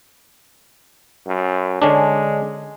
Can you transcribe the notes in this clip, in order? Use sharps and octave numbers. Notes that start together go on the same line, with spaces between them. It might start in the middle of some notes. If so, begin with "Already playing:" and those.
F#2
D3 G#3 C#4 D4